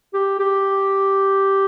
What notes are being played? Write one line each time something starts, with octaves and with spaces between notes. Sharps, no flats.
G4
G4